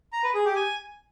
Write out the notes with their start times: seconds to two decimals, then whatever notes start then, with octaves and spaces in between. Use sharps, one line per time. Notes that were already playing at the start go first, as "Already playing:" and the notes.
0.13 A#5
0.23 B4
0.34 G#4
0.45 G4
0.56 G#5